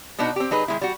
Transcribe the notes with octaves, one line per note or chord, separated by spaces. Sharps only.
B2 B3 D4 D#4 F#4
C4 G4
F#3 D#4 G#4 B4
D#3 G#3 E4
G3 F#4